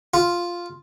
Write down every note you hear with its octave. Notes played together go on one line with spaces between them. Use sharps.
F4